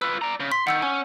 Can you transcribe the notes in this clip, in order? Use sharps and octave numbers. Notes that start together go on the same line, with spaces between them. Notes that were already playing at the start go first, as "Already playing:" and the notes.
F4 B4 E6
D5 A#5
C#3
C6 B6
D#3 F#5 E6 G6
C#4 G#5